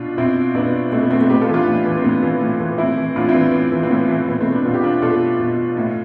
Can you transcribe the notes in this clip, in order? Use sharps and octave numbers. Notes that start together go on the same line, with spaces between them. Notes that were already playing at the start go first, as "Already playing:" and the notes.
Already playing: B2 D4 F4
B2 C4 E4
B2 B3 D4
B2 A3 C4
B3
A3 C4
A3 C4
A2 G4 B4
F4 A4
E3
D4 F4
A2
E3
C4
A2 B3 D4
E3
A2
E3
A2 C4 E4
E3
A2 D4 F4
C4 E4
E3
B3
A2
E3
C4
A2 B3
E3
B2 B3
A3 C4
B3 D4
B2 F4
G4
D4 F4
B2 F4 A4
B2
A2